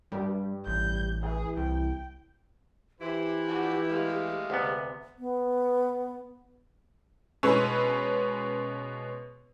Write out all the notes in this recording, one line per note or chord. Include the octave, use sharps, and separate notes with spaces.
G2 G3
A1 G6
E3 G#4
C2 G5
E3 E4 G4 C5
F3 D4 F#4
G#3 A3 F5
D2 C3 B3
B3
B2 G#3 C#4 B4 C#6 E6